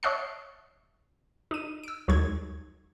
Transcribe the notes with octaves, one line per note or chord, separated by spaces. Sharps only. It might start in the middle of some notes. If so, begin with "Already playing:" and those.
C#5 D#5 E5 F#5 A5 C7
D#4 D#7
E6 D7
D#2 F#3 G#3 D#4 G#6